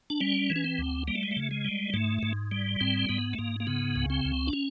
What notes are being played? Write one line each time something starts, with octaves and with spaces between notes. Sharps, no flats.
D4
G3 C#4
E3
C#4
C4
D2
G3 A#3
A3
G#3
A3
C#3
G#3
G3
G#2 A3
G#2
G3
G#2 C4
G#2 B3
A3
G#2 A#3
A#3
C#3 B3
C#2
C4
C#2
D4
C#4